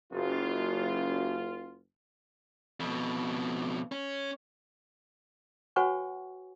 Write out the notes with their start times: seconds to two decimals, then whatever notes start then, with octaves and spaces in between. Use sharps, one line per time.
0.12 F#1 F#2 F4
2.80 F2 B2
3.92 C#4
5.76 F#4 B4 C#5 F#5 G#5 C#6